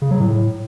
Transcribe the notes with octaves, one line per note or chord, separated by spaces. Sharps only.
C#3
F#3
A2